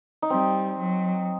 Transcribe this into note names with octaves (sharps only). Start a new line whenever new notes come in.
D#4
G3 C4
F#3